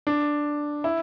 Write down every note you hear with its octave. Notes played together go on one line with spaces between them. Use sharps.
D4
E4